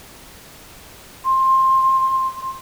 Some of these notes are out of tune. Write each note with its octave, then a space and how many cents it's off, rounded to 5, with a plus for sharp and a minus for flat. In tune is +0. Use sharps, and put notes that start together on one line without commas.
C6 +15